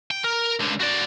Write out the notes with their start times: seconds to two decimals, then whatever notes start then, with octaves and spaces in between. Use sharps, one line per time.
0.11 G5
0.24 A#4
0.60 C#2 D3
0.81 F#4 D5